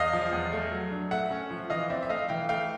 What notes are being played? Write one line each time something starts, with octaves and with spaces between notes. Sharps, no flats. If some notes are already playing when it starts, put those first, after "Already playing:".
Already playing: E2 D#5 F5
F3
E2
A3
F#3
D4
A3 E5 F#5
C#4
F3
E3 D#5 F5
C4 D5 E5
E5
A3 D#5 F5
E3 F5 G5
A3 F5 G5